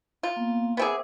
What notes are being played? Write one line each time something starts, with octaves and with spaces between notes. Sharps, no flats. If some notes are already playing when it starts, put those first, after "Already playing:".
F4
A#3 B3
B3 C4 G#4 A#4 E5 D6